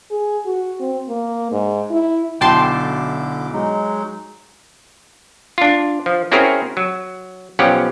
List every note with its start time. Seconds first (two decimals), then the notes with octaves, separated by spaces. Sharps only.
0.11 G#4
0.46 F#4
0.80 C4
1.08 A#3
1.52 G#2
1.91 E4
2.41 B1 D3 E4 F#4 G5 A5 C6 D6
3.53 F#3 G#3 D#4
5.58 D4 F4
6.06 F3
6.32 C4 C#4 E4 F#4 G#4 A#4
6.77 F#3
7.59 B1 F3 C#4 G4 F#5